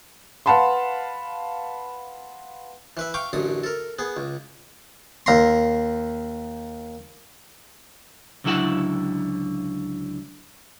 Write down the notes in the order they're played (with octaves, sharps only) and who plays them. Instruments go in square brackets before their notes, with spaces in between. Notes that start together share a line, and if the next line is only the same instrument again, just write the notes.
[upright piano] B4 F5 F#5 A5 B5 C6
[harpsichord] E3 B4 E5
F5 G5 C#6 D6
A1 F#2 D3 D#6
A4 A#4
B3 G#4
C#2
D#2 A#5 C6
[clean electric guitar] C#2 D3 F#3 E4 A4 F#5